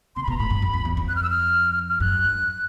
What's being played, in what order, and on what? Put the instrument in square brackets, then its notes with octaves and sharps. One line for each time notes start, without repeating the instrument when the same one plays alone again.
[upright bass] C3 [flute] C6
[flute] B5
[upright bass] B2 [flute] A#5
[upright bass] A2 [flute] B5
[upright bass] G2
F#2
F2
E2
F2
[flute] F#6
F6
E6
F6
F6
[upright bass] F#2 [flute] F#6
[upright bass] G2